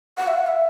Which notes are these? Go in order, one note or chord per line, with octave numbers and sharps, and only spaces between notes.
F#5
E5
F#5
E5